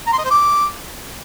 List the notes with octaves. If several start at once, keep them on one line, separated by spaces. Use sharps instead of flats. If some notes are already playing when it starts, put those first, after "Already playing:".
A#5
C6
D#5
C5
D6